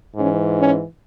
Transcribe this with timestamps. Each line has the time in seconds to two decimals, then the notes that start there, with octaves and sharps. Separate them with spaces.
0.16 G#2 E3 C#4
0.58 C#4